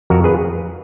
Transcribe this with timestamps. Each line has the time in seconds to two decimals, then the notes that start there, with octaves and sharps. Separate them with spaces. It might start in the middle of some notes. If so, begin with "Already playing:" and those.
0.10 F2 F#4 A#4
0.24 G#4 B4